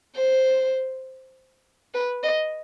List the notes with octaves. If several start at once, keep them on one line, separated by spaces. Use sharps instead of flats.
C5
B4
D#5